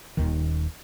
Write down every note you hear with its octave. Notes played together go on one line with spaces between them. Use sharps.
D#1 D#2 D#3